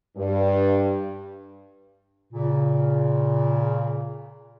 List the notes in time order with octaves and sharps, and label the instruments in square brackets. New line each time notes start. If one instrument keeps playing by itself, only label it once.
[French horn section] G2
[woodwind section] A#2 C#3